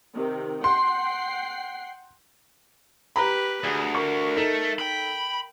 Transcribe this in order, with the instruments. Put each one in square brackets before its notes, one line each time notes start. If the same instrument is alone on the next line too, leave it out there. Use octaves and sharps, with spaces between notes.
[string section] C3 D#3
[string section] F#5 G5 C7 [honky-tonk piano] C6
[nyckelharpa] G4 B4 [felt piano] A#5 B5
[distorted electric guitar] D2 [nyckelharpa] G#4
[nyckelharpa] A#4 [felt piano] C#6
[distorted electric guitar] A3 [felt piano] D#4 A4
[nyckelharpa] G5 [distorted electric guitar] B5